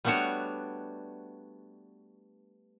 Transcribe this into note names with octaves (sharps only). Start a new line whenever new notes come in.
G3 A3 B3 D4 F#4 C#5